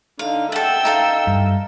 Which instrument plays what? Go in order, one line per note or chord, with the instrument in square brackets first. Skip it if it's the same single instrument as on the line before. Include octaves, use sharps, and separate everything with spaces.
[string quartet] D3 D#4 [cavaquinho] F5
[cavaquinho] A4 F#5 [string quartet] E5 G5 E6
[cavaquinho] D#4 A4 F5
[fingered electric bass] G2